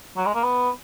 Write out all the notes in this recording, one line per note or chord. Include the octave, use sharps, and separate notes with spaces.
F#3
G#3
A#3
B3